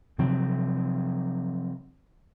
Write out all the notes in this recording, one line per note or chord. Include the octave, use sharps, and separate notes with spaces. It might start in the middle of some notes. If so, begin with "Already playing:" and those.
C3 F3 F#3 C4